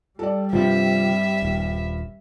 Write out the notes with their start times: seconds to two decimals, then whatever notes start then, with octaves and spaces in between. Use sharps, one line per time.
0.19 G3 A4 D5
0.53 G2 C3 F3 C4 E5
1.42 D#1